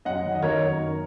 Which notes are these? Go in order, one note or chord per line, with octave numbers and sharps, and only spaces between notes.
F#2 D#5 F#5
D#3
D#5
D#3 A#4 C#5
F#2
F#2